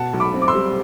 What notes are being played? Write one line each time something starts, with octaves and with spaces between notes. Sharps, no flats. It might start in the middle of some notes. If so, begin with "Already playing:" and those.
Already playing: B2 F#5 A5
B1
B5 D6
C4
D6
C6 E6
G3